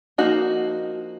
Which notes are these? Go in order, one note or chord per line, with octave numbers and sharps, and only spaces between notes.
F3 A#3 D#4 F#4